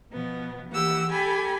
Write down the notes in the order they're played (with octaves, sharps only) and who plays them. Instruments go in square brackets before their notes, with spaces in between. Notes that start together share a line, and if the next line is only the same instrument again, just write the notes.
[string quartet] B2 F3 B3
E3 A#3 G4 F#5 E6
G4 A4 G5 G#5 B5